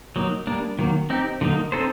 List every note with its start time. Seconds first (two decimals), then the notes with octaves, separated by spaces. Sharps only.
0.16 F#3 A#3 D#4
0.47 G3 A#3 D4
0.79 D#3 F#3 A#3
1.10 C4 D#4 G4
1.41 D3 F#3 A#3 D#4
1.72 C4 D#4 A4 C5